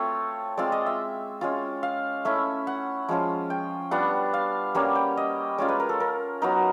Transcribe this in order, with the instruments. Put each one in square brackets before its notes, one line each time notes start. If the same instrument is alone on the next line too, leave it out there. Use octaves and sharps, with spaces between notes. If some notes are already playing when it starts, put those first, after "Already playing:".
Already playing: [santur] A3 C4 F4 C#5
G#3 C4 F4 D5
D#5
E5
G#3 C#4 F4
F5
A3 C#4 E4 E5
F#5
F3 G#3 C#4 F4
G5
G3 B3 D4 F4 F#5
F5
G3 A#3 C#4 F#5
G5
D#5
G#3 C#4 F4 D5
B4
A#4
A4
A#4
F#3 B3 D#4 A#4